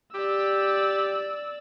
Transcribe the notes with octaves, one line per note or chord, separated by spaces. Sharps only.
G4 D5 E6